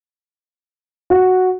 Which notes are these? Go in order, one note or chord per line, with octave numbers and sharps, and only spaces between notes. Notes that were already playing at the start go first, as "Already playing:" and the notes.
F#4